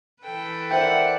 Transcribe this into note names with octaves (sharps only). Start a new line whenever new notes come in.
E3 A4 B4 G5
A#4 C5 D5 E5 F#5 G5